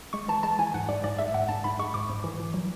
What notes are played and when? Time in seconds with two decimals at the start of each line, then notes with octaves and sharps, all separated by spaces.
0.13 G#3 C#6
0.28 E3 A5
0.43 G#3 A5
0.59 E3 G#5
0.74 G#2 F#5
0.89 G#2 D5
1.04 G#2 D5
1.18 G#3 E5
1.34 G#2 F#5
1.48 G#2 A5
1.64 G#2 B5
1.79 G#3 C#6
1.94 G#2 D6
2.10 G#2
2.24 E3
2.40 E3
2.54 F#3